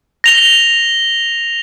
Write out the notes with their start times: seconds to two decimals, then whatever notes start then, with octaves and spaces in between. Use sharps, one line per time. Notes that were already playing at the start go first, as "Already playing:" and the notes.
0.24 A#6 F7 G7